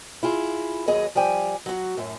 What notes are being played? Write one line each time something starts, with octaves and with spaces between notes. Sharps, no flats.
E4 F4 G#4
D#2 F#3 G#4 D#5
F3 G3 D5 G5 G#5
F#3 F#4
F#2 A2